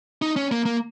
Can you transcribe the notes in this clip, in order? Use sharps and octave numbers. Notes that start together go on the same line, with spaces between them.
D#4
C#4
A#3
A#3